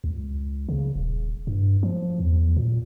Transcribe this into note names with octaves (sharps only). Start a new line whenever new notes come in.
C#2
C#3
D#1
G2
F3
E2
A#2